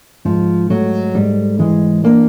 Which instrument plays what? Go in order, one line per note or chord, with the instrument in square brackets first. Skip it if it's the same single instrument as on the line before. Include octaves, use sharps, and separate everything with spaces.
[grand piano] G#2 [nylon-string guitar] F3
[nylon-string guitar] F#3 [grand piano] A3
[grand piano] G#2 [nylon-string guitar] G3
[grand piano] E3 [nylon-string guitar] G#3
[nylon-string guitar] A#3 [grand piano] D4